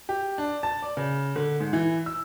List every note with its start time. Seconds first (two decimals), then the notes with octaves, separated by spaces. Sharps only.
0.09 G4
0.38 D4
0.63 A5
0.82 D5
0.97 C#3
1.36 D3
1.60 G#2
1.73 E3
2.06 E6